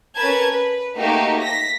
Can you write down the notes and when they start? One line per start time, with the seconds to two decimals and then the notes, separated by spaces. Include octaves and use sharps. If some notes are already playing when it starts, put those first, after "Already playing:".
0.17 C#4 A#4 B4 A5 G#6
0.51 B4
0.97 A3 A#3 D#4 F#4 G4
1.42 A#6 B6